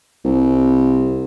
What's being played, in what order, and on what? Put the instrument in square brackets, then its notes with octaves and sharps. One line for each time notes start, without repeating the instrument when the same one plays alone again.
[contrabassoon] C2